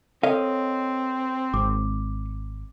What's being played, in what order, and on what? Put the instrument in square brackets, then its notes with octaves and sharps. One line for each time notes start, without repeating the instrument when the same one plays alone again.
[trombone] C4 [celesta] A4 A#4 [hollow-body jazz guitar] C#5 D#5 F5
[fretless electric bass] G#1 [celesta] D6